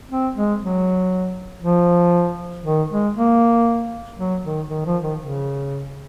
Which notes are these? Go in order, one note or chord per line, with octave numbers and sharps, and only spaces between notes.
C4
G#3
F#3
F3
D#3
G#3
A#3
F#3
D#3
D#3
F3
D#3
C#3